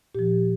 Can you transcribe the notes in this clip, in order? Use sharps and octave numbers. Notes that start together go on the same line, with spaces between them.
A#2 F3 G4